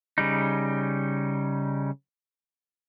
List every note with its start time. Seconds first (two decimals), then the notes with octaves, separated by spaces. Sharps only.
0.18 C#3 G3 D#4